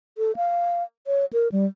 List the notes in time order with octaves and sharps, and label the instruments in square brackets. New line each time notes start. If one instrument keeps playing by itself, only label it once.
[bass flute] A4
F5
C#5
A#4
G3